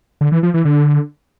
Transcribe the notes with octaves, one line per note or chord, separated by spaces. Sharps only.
D3
E3
F3
E3
D3